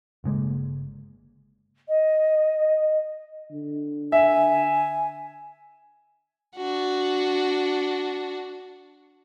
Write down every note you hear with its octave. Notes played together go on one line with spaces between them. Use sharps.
G1 C#3 G#3 A#3
D#5
D3
E5 G#5
D4 F#4